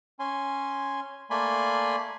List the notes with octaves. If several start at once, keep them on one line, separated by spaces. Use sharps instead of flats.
C#4 G#5 C6
A3 A#3 D5 G#5 B5 C6